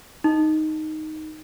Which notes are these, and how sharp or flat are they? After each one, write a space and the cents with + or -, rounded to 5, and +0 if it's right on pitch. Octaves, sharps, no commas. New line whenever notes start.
D#4 +0